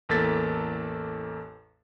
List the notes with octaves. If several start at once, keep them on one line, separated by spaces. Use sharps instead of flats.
A1 E2 A#3 A4 A6 B6